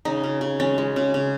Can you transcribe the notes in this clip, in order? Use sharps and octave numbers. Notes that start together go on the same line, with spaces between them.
C#3 D#4
C#3
C#3
G#3 C#4
G#3
C#3
C#3